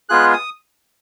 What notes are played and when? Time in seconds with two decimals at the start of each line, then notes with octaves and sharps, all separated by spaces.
0.09 G#3 B3 F4 G#4 F#6
0.33 D#6